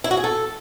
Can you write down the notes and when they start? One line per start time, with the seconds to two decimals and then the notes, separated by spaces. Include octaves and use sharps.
0.04 E4
0.11 F#4
0.17 G#4
0.24 A4